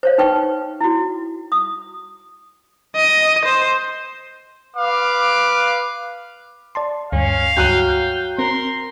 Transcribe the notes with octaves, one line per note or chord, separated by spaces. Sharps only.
C5 C#5 F5
D#4 B4 G5 C#6
E4 F#4
D#6
D#5
C5
B4 F5 D6
D5 A5 C6
D2 G2 C#4 F5
C#2 G2 F#3 G5 F#6 D#7
C4 A#4 C6